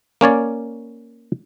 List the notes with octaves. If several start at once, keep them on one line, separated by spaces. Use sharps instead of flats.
A#3 C#4 C#5 D5